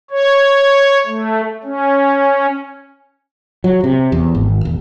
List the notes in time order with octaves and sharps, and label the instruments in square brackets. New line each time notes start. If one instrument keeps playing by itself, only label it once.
[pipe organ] C#5
A3
C#4
[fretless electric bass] F#3
C3
E2
G#1
E1